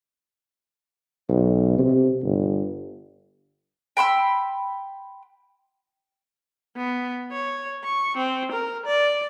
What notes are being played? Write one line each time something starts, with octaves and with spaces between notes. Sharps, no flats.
B1
C3
G1
G5 B5 C6 E6
B3
C#5
C#6
C4
A#4
D5